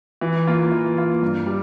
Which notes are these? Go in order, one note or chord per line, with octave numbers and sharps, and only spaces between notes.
E3
A#3 F4
E3
A#3 F4
G2
G3